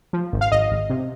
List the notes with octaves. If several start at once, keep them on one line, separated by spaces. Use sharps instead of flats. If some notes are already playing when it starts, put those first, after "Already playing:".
F3
G#1
F5
G#1 D#5
G#1
C3